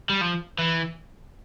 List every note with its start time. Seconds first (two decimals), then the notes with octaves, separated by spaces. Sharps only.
0.09 G3
0.21 F3
0.59 E3